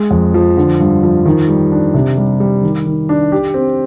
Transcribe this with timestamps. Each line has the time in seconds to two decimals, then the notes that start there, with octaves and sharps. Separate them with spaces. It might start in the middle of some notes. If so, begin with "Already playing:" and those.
Already playing: G#3
0.11 F2
0.34 F3
0.57 D3
0.80 G2
1.03 F3
1.25 D#3
1.48 G3
1.72 D4
1.94 C3
2.17 G3
2.40 G3
2.63 D#3
2.86 D#3
3.09 D4
3.32 G4
3.54 C4